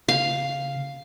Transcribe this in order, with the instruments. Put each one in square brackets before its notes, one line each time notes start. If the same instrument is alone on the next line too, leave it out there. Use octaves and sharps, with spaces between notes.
[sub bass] C#3 [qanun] F5